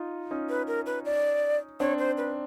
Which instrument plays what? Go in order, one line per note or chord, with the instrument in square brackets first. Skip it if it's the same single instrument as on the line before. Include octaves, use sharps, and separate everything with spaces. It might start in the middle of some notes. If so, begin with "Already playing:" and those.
Already playing: [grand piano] D#4 F4
C#4 D#4
[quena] B4
A#4
B4
D5
[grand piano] C4 D4 [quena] C#5
[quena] C5
B4